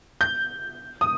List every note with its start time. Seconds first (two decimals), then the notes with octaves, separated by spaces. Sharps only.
0.21 G6
1.01 D#6